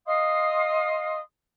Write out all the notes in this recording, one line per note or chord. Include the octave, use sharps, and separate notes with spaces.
D#5 F5 C6 D#6